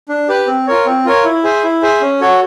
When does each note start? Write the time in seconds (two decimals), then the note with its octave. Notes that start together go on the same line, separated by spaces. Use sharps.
0.09 D4
0.29 G4 B4
0.47 C4
0.67 F4 A#4 C#5
0.86 C4
1.05 F4 A#4 C#5
1.25 E4
1.44 G#4 C5 E5
1.63 E4
1.82 G#4 C5 E5
2.01 C#4
2.21 F#4 A4 C#5